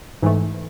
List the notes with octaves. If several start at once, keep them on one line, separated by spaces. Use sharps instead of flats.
G#2 E3 A3